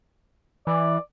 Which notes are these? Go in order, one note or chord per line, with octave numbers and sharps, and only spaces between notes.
E3 D5